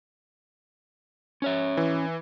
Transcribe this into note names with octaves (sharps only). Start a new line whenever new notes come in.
C#4 C#5 E5
E3